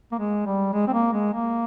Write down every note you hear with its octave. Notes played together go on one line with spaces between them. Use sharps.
A#3
G#3
G3
G#3
C4
A#3
G#3
A#3